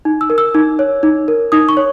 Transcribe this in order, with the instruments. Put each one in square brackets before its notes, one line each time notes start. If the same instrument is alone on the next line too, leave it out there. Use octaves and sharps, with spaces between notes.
[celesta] D#4
E6
A#4
E6
D#4
C#5
D#4
A#4
D#4 D#6
C#6
C#5